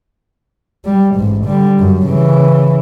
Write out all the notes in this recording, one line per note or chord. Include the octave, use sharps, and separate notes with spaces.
G3
A1 G#2
D3 G3
F#2
C#3 E3